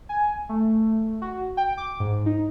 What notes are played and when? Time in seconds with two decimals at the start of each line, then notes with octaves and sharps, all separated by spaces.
0.09 G#5
0.49 A3
1.22 F#4
1.57 G5
1.77 D6
2.00 G#2
2.26 D#4